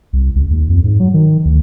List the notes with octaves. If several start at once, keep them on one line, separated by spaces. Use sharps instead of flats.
C2
C#2
D#2
F2
G#2
F#3
D#3
D2